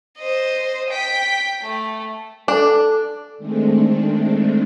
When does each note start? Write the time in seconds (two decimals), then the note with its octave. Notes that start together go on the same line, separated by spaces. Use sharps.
0.18 C5 D#5
0.90 G5 B6
1.62 A3
2.48 D4 A4
3.38 D#3 G#3 A3 C4 D4